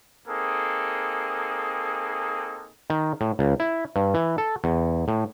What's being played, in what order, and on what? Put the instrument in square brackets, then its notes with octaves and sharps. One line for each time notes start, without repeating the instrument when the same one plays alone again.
[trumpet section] A#3 C4 D#4 G#4 A4
[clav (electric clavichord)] D#3
A2
C#2
E4
G2
E3
A4
E2
A2